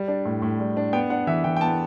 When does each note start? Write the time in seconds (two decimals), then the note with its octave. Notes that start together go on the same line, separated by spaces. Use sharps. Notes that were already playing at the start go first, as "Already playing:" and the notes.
Already playing: G3
0.08 D4
0.25 A2
0.42 A2
0.60 G3
0.77 D4
0.93 B3 G5
1.10 D4 F#5
1.27 E3 E5
1.44 E3 G5
1.57 G5
1.61 B3 A5